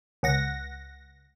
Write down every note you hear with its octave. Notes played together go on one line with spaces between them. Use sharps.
C#2 F#5 A#6